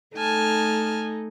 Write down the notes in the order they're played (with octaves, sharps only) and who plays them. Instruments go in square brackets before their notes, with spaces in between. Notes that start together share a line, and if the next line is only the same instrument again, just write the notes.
[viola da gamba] A3 D#4 A4 [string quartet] G#5 A5 F6